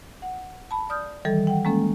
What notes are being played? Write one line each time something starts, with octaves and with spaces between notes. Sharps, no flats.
F#5
A5 B5
D5 D#6 F6 G6
D#3 E3 G3 A4
F#5 G5
G#3 A#3 C#4 A4